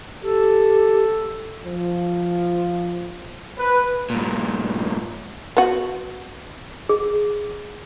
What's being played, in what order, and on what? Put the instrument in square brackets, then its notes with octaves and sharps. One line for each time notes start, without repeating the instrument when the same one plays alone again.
[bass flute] G4 [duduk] A4
[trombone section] F3
B4
[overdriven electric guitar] G2 A#2
[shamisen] B3 F#4
[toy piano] G#4